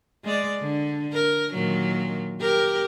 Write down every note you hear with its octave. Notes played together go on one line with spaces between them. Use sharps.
G#3 D5
D3
A#4
A#2 D#3 F#3
G4 A#4